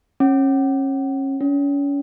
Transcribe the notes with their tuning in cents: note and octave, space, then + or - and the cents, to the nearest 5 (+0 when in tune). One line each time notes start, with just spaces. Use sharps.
C#4 -30
C#4 +35